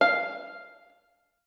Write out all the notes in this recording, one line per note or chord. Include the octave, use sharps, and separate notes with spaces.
F5